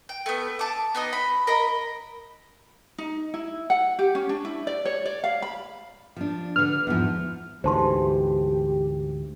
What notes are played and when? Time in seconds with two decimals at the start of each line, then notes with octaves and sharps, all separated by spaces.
0.09 G5
0.26 A3 B3
0.59 A5 D6
0.95 B3 D#4 D#5
1.13 B5
1.47 A#4 D#5 B5
2.98 D#4
3.34 E4
3.70 F#5
3.99 G4
4.15 C#4
4.29 D4
4.45 E4
4.67 D5
4.85 C#5
5.06 D5
5.24 F5
5.42 B5
6.16 F3 D4
6.56 D3 B4 F6
6.87 E2 G#2 F3
7.64 D2 G#2 E3 G4 C5 A5 C6